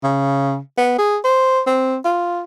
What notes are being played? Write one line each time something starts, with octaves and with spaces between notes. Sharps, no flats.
C#3
B3
G#4
C5
C4
F4